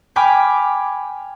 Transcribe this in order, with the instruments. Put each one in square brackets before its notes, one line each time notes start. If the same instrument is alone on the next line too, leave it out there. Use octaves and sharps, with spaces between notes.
[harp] G5 G#5 B5 D6 F6